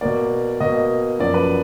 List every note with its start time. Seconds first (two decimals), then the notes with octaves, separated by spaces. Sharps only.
0.01 B2 A#3 D5
0.60 B2 A#3 D#5
1.19 F#2 F3 A#3 D5
1.34 B4